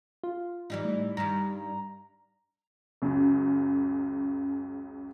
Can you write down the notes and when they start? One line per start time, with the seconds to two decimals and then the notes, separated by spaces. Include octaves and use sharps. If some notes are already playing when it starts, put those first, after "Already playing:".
0.23 F4
0.70 E3 G3 D#4
0.85 A2
1.17 G2 D#3 A#5
3.02 C#2 F#2 C#3